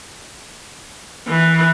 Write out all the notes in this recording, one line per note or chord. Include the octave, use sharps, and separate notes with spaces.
E3